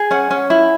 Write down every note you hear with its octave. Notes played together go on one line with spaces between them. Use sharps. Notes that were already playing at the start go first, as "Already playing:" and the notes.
Already playing: G#4
C#4 F#5
C#4
E4